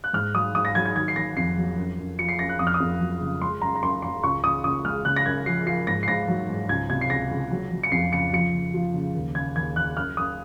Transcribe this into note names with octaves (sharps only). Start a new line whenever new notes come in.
F#6
G#2 F6
F#3 D#6
G#2 D#6
A#6
F#3 G#6
G#6
D#3 G#6
C7
D#3 A#6
F2 C7
F#3
F#2
F#2
F3 C#7
C7
F#2 A#6
F#6
F2 D#6
F6
D#6
F2
F#3
C#3
G#3 C6
F#2 A#5
A#5
F#2 C6
F#2 C6
C#2 C#6
C#2 D#6
C#2 D#6
G#3 F6
C#3 F#6
A#6
F#2 G#6
F3 C7
F3 C7
G#2 A#6
C7
G#2 A#6
F#3
G#2
C#2 G#6
C3 G#6
C7
C#2 A#6
C#2
F#3
F#3
C#7
F2 C7
C#3 C#7
F3 C#7
C#3
F3
C#3
D#2
C#3 G#6
D#2 G#6
D#2 F#6
F#2 F6
F#2 D#6